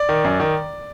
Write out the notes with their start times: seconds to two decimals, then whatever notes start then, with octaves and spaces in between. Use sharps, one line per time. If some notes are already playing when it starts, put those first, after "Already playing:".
Already playing: D5
0.09 D#3
0.24 F#2
0.40 D#3